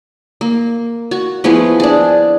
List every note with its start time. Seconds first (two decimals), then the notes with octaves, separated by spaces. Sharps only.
0.41 A#3
1.11 F#4
1.44 F3 B3 E4 G#4
1.80 D4 G#4